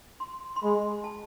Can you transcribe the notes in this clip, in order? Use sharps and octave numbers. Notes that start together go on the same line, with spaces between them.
C6
C6
G#3 B5
A5